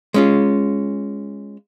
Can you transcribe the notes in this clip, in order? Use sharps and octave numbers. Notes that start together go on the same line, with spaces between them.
G#3 C#4 F4